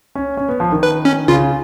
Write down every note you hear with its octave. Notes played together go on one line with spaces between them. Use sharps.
C#4
C#4
B3
F3
D#3
B4
C#4
C#3 F4